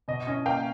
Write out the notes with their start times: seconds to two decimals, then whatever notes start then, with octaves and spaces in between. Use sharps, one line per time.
0.08 B2 D#5
0.27 C#4 D#5
0.46 A#3 F5 G5